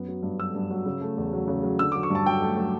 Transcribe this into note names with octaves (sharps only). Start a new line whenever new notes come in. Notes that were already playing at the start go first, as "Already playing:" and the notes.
Already playing: F#2 B3
F#3
G2
F#3 E6
G2
F#3
C#3
A3
E2
F#3
C#3
F#3
D3 E6
D6
F#3
C#6
G2 A5
F#3 G5
A3
F#3